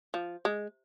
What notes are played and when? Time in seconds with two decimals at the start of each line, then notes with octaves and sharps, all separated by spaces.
0.14 F3
0.45 G#3